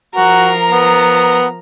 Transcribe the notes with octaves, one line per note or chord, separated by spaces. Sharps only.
F3 F#4 A#4 A#5
B3